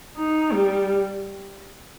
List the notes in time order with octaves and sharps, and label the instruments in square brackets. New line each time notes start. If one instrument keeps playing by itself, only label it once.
[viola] D#4
G3